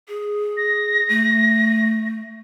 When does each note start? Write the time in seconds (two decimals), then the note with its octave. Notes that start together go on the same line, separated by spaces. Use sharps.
0.08 G#4
0.57 A#6
1.09 A3